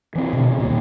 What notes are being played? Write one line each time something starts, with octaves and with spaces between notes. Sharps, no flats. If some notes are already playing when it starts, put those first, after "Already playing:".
E3 C4
B2 D3
C#3
D#2 A#2